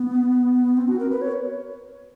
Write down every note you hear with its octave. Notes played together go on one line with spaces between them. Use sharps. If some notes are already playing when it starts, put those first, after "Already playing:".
Already playing: B3
C4
F#4
A#4
B4
C#5